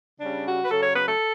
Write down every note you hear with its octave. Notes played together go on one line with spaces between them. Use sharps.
C#3 G3 C#4 D4
F#4
B4
C#3 F#3 C#4 A4
C#5
B4
A4